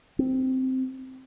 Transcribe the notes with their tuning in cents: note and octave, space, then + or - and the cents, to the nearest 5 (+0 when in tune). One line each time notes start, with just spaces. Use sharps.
C4 -5